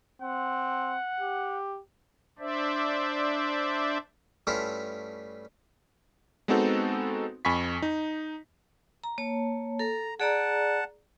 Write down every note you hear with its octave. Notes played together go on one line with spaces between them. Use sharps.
C4 F#5
G4
D4 C5 D5 E5
G2 A3 C#4 E4 F4
G#3 B3 C4 D#4 F#4 A4
F2 G#5 B5 C#6 B6
D#4
A#5
A#3 C#5 A5
A4 A#5
G#4 D5 F#5 A5 A#5